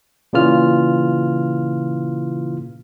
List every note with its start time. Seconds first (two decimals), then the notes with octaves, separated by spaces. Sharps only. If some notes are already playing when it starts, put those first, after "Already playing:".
0.33 A#2 C#3 E3 F4 F6